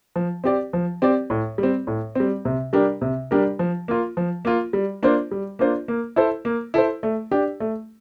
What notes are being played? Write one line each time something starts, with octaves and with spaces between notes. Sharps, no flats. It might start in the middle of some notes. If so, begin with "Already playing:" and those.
F3
C4 G4 D5
F3
C4 G4 D5
A2
G3
C4
A2
G3 C4
C3
G3 D4 G4 A#4
C3
G3 D4 G4 A#4
F3
A#3 F4
F3
A#3 F4
G3
A#3 D4 F4 C5
G3
A#3 D4 F4 C5
A#3
E4 A4 C5
A#3
E4 A4 C5
A3
D4 G4 D5
A3